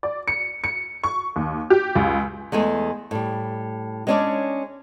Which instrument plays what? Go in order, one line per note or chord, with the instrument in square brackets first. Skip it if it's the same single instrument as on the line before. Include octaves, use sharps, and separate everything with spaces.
[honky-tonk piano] D5
C#7
C#7
C#6
D#2
G4
C#2
[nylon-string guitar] E2 G#3 A3 G#4
A2 G3
G#3 B3 C#4 D4 C#5 D5